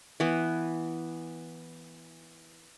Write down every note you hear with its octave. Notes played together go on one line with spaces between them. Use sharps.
E3 B3